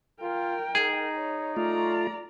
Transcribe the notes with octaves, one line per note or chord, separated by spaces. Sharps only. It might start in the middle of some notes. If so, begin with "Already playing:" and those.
F4 A#4 G5
D#4 G#4
C#5
A3 F4 D5 A#5